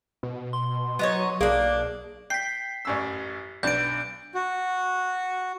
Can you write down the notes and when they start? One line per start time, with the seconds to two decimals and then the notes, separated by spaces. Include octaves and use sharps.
0.23 B2
0.53 C6
0.99 F#3 B3 D#4 C#5
1.41 B1 A#3 D4 G#4
2.30 G5 B6 C7
2.85 A1 F#2 E6
3.63 B1 D4 G6 D7
4.35 F#4